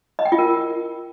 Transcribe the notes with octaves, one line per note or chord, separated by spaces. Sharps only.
D#5
G5
F4
A#4